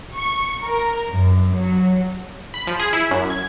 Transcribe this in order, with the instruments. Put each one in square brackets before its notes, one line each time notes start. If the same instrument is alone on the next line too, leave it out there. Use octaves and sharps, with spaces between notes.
[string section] C#6
A#4
F#2
F#3
[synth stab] B5
F3
G#4
E4
F#2
G#6